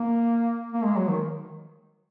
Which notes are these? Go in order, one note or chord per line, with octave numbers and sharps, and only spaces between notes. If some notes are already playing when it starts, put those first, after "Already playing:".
Already playing: A#3
A#3
G#3
F#3
D#3